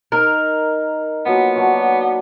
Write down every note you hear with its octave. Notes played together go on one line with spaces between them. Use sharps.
D#4 A#4
F3 F#3 A#3 B3
F#3 D4 C#5